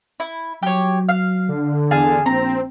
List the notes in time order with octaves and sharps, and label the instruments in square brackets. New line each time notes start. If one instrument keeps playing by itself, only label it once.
[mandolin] E4
[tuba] F#3 [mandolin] G4 C#5
[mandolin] F5
[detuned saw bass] D3
[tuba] E2 [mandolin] G#4 F5 A5
[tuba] A#1 [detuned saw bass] C4 [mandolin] A#5